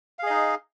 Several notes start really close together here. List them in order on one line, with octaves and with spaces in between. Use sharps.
F5 G#4 D#5 D#4